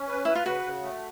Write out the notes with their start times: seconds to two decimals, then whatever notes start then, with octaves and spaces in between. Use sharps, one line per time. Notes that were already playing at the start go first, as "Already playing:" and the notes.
Already playing: C#4
0.08 B4
0.25 E4 B4
0.35 F4
0.46 C#3 F#4
0.64 C#3
0.83 A3